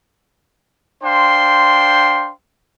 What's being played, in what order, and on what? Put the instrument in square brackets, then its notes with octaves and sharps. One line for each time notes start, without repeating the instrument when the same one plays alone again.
[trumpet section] D4 C5 F5 G5 C6